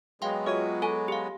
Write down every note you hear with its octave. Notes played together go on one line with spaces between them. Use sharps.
F#3 G#3 B3 F5 G5 C6
F4 F#4 G#4 C#5 D#5 E5
A4 G#5 C#6
G4 F5